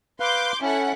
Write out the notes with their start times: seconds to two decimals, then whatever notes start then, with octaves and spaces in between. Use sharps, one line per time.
0.20 B4 F5 C6 D6 G6
0.62 C#4 E4 A4 F#5